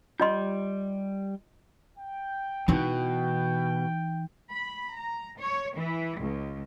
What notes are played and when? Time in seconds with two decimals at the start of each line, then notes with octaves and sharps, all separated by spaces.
0.20 G3 F4 D#5 C6 G6
1.97 G5
2.68 B2 E3 D#4
4.51 B5
4.96 A#5
5.39 C#5
5.77 E3
6.21 C#2